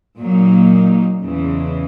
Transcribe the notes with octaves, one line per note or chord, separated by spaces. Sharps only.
A#2 F#3 A#3 D#4
E2 C#3 E3 G#3